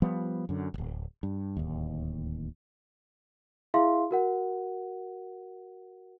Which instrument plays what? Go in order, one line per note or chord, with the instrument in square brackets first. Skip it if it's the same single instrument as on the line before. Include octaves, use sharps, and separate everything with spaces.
[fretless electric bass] F3 G3 B3
F#2 D3
D1 G1
G2
D1 D#2
[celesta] E4 G#4 E5 F5 C6
F#4 A#4 F#5